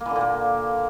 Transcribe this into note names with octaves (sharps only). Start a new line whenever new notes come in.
A#3
E3
D3
A#2
A#3